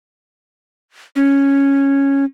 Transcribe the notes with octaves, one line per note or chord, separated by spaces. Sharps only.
C#4